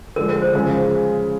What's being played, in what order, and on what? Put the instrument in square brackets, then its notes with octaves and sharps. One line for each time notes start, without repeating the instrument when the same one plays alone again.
[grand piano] D3 F3 G#3 [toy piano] A#4
[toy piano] A#4
C5
[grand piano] C#3 F3 G#3